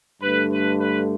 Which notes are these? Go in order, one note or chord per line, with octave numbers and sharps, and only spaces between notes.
G2 D3 A3 B4
B4
B4